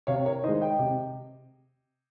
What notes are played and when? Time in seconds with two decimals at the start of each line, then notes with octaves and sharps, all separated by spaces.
0.07 C3 C#5 F5
0.25 A#4 C#5
0.44 D#3 C5 D#5
0.48 G#3
0.61 D#5 G5
0.79 C3